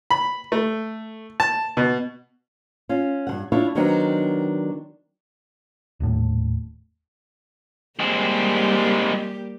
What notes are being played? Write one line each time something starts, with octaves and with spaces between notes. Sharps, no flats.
B5
A3
A5
B2
C#4 F4
G2 F3 F#5
D4 E4 F4 C#5
D#3 F#3 B3 C4 D4 D#4
D#1 A2
G3 G#3 A#3 C4 G4